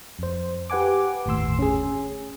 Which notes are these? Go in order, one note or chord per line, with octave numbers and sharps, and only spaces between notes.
F2 C5
G4 B4 F#5 G#5 D6
G1 D#2 A2 C6 E6
C#4 G#4